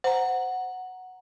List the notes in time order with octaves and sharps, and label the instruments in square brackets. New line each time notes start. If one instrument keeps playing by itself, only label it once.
[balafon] C5 [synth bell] F#5 A#5